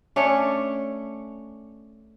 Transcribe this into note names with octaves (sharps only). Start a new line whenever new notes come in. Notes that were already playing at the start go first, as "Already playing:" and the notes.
A3 C#4 D4 C#5